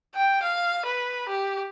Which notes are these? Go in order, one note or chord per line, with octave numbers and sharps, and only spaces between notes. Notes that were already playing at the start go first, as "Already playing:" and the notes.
G5
F5
B4
G4